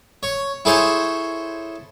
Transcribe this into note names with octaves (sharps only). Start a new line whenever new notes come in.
C#5
E4 G#4 A4 C5 C#5